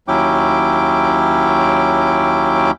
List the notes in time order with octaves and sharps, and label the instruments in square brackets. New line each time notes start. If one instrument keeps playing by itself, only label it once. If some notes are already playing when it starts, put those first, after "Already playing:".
[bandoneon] D#2 F#3 C#4 E4 G5 D6